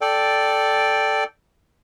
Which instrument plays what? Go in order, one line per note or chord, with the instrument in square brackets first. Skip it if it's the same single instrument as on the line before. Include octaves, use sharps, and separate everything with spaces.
[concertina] A4 D5 G5